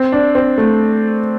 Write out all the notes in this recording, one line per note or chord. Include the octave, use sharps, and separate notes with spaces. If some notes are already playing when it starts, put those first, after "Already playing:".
Already playing: C4
D4
C4
A3